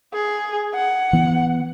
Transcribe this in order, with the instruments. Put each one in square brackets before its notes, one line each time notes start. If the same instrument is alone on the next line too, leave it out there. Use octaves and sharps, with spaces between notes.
[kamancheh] G#4
F#5
[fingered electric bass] E3 B3